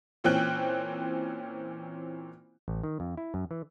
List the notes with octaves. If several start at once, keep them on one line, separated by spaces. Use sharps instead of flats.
A#2 E3 C4 C#4 G5 F#6
A1
D#3
F2
E4
F#2
E3